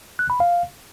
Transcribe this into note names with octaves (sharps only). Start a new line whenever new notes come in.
F#6
B5
F5